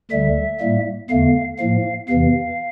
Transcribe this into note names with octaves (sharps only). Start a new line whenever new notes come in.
D2 D3 G3 E5
A2 G3 A#3
E2 D3 A3 F5
A2 F3 A#3 F5
E2 C3 E3 F5